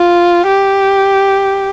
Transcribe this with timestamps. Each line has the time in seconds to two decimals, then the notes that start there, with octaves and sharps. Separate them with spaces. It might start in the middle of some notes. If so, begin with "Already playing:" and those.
Already playing: F4
0.47 G4